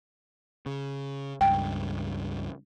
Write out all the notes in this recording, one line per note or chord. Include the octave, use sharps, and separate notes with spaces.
C#3
C#2 G2 G5